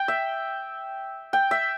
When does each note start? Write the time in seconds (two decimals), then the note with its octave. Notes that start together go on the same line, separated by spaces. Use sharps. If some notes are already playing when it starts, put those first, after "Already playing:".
Already playing: G5
0.08 E5
1.33 G5
1.51 E5